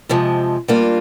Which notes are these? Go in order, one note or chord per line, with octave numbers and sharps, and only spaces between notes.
F2 C3 F3 G#3
G3 A#3 D4 F4